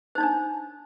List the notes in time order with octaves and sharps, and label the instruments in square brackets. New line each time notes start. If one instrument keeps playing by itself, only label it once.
[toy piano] C5
D#4
C#5
D4